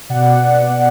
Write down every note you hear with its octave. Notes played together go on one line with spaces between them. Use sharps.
B2 D5 F#5
B2
B2
B2
B2